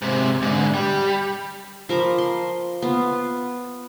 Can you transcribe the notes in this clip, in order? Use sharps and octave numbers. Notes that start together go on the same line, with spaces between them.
G#2 C3
G#2 D3
G3
F3 A#4 B5 D6
C6
B3 F4